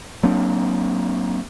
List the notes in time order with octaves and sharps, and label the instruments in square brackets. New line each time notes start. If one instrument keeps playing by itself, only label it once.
[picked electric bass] F#3 A#3 C4 D4